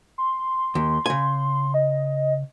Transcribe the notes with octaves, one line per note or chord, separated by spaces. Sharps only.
C6
D#2
C#3 G#5
D#5